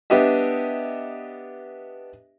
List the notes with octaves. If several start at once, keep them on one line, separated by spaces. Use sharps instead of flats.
B3 D4 G4 D#5 E5